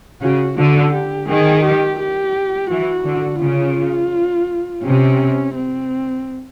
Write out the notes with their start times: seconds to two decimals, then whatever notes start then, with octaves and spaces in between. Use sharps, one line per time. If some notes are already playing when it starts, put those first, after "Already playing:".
0.22 C#3 F#4
0.58 D3 F#4
0.93 G4
1.28 D#3 G#4
1.64 G4
2.00 G4
2.70 E3 F#4
3.06 D3
3.41 C#3 F4
4.83 C3 C#4
5.55 C4